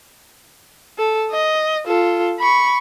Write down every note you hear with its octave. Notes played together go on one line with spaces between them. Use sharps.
A4
D#5
F4 A4
B5 C#6